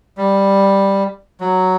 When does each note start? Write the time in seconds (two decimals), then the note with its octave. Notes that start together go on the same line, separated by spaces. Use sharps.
0.18 G3
1.41 F#3